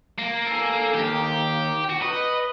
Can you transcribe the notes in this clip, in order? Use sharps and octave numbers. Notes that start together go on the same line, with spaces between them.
A#3
A4 G#5
D#2 D#3 G4
F#4
B4 D#5